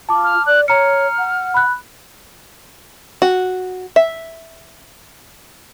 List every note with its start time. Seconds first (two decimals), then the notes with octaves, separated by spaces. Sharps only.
0.09 F4 A5 D6
0.24 F6
0.46 D5 F#6
0.68 C#5 A#5 F6 C#7
1.18 F#5
1.54 B5 F#6
3.22 F#4
3.96 E5